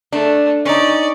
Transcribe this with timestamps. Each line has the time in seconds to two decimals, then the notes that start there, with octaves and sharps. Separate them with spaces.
0.12 A3 D4
0.65 C#4 D#4 D5